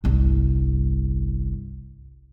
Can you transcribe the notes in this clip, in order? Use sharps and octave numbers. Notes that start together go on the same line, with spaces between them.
G1 C2